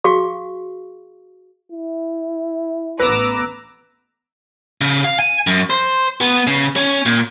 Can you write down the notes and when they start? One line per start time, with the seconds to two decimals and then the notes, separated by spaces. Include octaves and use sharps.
0.04 F#4 G#4 F5 C#6
1.72 E4
3.00 A1 B3 B4 A#5 D6 E6
4.81 C#3
5.04 F5
5.19 G#5
5.47 F#2
5.70 C5
6.21 B3
6.47 C#3
6.76 C#4
7.06 A#2